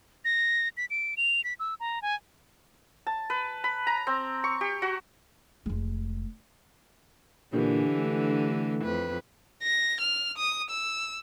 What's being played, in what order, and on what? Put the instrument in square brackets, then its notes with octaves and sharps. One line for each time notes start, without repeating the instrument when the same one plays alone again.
[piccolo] A#6
B6
D7
F7
B6
E6
A#5
G#5
[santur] A5
B4
B5
A#5
C4
C#6
G4
F#4
[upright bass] F1 G#3
[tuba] A#2 [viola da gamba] D3 E3 [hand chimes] D4 G4
[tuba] A3
[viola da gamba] F2 B4
[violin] A#6
F6
D#6
E6